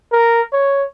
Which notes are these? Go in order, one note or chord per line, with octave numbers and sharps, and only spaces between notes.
A#4
C#5